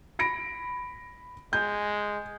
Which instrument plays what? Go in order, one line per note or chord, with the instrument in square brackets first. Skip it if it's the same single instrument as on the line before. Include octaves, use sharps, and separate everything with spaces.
[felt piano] B5 A#6 D7
[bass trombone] G#3 [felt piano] G6